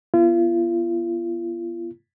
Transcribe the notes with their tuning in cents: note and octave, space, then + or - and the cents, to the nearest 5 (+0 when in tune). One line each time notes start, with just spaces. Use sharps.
B3 -25 F4 -40